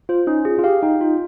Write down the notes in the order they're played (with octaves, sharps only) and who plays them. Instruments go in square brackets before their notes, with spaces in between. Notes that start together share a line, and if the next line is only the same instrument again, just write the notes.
[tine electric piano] F4 [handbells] C5
[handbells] C#4 [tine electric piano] D#4
[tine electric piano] F4 [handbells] G#4
[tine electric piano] F4
[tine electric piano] G4 [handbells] F5
[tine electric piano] D#4 [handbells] G5
[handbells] F4